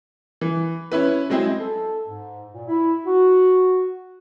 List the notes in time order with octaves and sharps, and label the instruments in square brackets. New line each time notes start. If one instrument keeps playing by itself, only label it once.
[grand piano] E3
C#4 E4 B4
F#3 G#3 C4 E4 G#4
[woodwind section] A4
G#2
A#2
E4
F#4